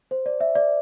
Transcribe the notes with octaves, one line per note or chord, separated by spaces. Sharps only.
C5
D5
E5
D5